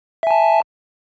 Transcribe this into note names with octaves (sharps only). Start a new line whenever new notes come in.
E5 G#5 A5